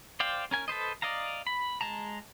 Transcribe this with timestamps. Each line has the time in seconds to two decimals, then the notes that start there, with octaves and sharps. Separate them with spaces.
0.20 C5 D5 F5 G5
0.51 C#4 A#4 G#5
0.68 A4 B4 C5 D#5
1.02 D5 D#5 F5 A#5
1.47 B5
1.81 G#3 A5 A#5